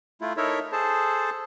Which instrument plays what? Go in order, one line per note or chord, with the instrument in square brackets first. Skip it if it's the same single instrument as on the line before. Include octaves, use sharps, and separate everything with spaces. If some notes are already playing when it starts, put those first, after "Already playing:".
[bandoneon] A3 E4 F4
D#4 E4 A4 A#4 C#5 E5
G#4 A4 C5 A5